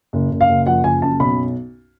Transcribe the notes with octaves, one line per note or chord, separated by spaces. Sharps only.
F#1
F#1
F5
F#1
F3 F#5
F#1 G#5
F#2 A5
B1 B5